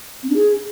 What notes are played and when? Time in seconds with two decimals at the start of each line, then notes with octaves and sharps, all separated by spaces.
0.23 C4
0.29 D4
0.36 G#4